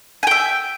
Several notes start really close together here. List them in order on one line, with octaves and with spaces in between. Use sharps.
G#5 G5 E5